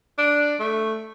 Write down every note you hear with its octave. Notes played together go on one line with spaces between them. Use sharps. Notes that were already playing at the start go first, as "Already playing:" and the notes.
D4
A3